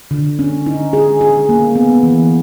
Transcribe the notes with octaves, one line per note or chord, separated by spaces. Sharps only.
D3
C#4
D#4
G#4
G#4
A#3
B3
E3